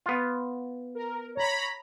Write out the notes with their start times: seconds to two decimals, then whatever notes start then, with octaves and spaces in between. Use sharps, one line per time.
0.06 B3 F4
0.95 A#4
1.35 C#5 A#5 B5